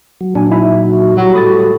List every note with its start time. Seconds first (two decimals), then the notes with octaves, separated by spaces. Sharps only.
0.21 F#3
0.35 A#2 F#3 D4 G#5
0.51 D#4 E4 E5
0.87 F#4
1.17 F#3 G3
1.34 A2 B5 D#6 A6